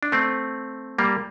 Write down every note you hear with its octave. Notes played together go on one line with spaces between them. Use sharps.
D4
A3 C4
G3 A#3